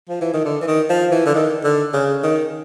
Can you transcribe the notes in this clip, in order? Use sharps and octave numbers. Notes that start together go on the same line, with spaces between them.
F3
E3
D#3
D3
E3
D#3
F3
E3
D3
D#3
D3
C#3
D#3